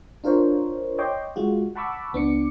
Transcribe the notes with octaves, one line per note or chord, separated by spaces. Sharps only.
D4 F4 A#4 C5 C#5
C#5 D#5 G5 C6 D6
G#3 F4 F#4
F#5 A5 B5 C#6 D6 E6
C#2 B3 D4 D6 C#7